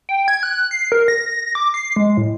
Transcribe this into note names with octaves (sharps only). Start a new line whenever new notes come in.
G5
G#6
F#6
C7
A#4
A#6
D6
C7
G#3
A2